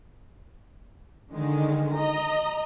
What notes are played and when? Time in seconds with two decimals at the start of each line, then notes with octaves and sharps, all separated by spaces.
1.33 D3 D#3 G#3
1.95 D#5 A#5